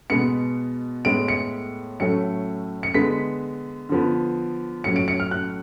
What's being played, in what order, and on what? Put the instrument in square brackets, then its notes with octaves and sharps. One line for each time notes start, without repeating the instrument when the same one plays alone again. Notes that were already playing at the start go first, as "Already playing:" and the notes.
[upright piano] B2 G#3 B3 C#7
A2 G#3 B3 D7
C#7
A2 F#3 A3 C#4 C#7
C#7
D3 G#3 B3 B6
D3 F3 B3
A2 F#3 C#4 C#7
D7
C#7
F6
F#6